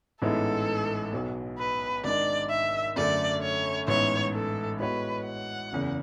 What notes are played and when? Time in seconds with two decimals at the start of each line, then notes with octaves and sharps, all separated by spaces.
0.21 A1 G#2 G#3 B3 E4 A4
1.13 B1 B2 G#3 B3 F#4
1.58 B4
2.04 G#1 G#2 G#3 D4 D5
2.50 E5
2.96 F#2 D3 A3 D5
3.42 C#5
3.87 A1 G#2 G#3 B3 E4 C#5
4.34 A4
4.79 A2 G#3 B3 F#4 B4 C#5
5.25 F#5
5.72 F#1 E2 C#3